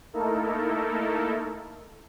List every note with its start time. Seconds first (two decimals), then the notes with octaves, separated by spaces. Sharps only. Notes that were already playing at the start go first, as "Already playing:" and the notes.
0.13 A3 A#3 D#4 E4 A4 A#4